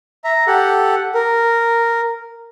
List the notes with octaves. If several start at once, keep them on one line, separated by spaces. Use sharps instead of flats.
E5 A#5
G4 A4 F#5
A#4